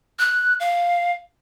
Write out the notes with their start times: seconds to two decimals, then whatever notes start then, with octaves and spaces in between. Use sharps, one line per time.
0.19 F#6
0.60 F5